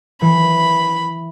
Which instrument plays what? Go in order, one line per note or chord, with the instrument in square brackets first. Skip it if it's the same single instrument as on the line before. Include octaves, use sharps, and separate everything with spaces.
[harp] E3 [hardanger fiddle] B5